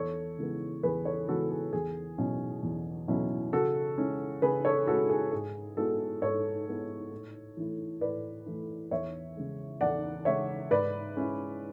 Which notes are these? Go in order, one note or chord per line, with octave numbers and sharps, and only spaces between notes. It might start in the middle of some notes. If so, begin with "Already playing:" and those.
Already playing: E2 A4 C#5
C#3 E3 G#3 B3
E2 G#4 B4
A4 C#5
C#3 E3 G#3 B3 F#4 A4
G#4
E2 G#4
B2 F#3 C#4 E4
E2
B2 F#3 C#4 E4
C#3 F#4 A4
G#3 C#4 E4
C#3 G#4 B4
A4 C#5
G#3 C#4 E4 F#4 A4
G#4
G#2 G#4
G#3 B3 E4 F#4 A4
G#2 A4 C#5
G#3 B3 E4
A2
E3 A3 E4
A2 B4 D5
E3 A3 E4
E2 C#5 E5
C#3 G#3
E2 D5 F#5
C#3 G#3 C#5 E5
G#2 B4 D5
G#3 C#4 E4